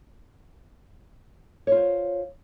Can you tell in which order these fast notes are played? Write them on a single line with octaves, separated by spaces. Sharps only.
C#5 F4 C5